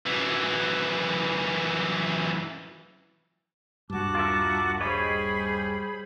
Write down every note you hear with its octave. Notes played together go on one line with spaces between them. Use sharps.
F#2 E3
D#1 G2 F#4 A5 D6
F4 A#4 E5
G3 G#4 C5 C#5 D#5 B5